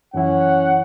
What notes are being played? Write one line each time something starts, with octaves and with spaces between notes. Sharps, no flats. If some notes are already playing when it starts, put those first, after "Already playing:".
F#2 E3 C#4 E4 F#5